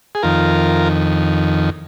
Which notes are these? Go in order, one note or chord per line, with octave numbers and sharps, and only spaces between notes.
G#4
F2 D#3 F4 A#4